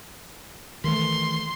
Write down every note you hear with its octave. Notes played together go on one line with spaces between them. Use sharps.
D#3 E3 A3 C6